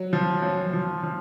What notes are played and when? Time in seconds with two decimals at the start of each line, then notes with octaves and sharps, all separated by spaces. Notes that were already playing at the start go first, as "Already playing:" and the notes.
Already playing: F#3
0.13 F3
0.43 F#2
0.73 F3
1.03 F3